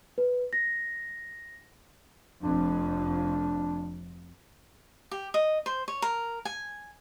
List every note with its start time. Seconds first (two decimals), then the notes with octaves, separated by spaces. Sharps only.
0.18 B4
0.53 A#6
2.43 F1 F2 D4
5.11 G4
5.34 D#5
5.66 C5
5.88 C#5
6.02 A#4
6.45 G#5